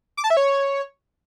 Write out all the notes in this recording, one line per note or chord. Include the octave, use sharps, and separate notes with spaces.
D6
A5
E5
C#5